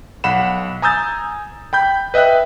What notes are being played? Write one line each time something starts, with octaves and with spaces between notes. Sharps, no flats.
B1 F#5 B5 E7
G#5 A#5 D#6 E6 G6 A6
G5 B5 G6
B4 D#5 E5 G5 F#6